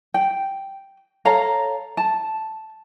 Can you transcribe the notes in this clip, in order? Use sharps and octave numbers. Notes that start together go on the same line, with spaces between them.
G5
A4 C#5 F5 A#5
A5